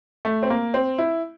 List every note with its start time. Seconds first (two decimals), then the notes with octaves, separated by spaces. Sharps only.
0.25 A3
0.43 C4
0.50 A#3
0.74 C4
0.98 E4